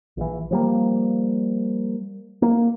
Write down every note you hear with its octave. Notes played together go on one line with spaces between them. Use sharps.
A#1 E3
F3 G3 A#3
A#3